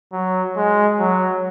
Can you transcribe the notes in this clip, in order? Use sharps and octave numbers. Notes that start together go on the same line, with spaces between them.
F#3
G#3
F#3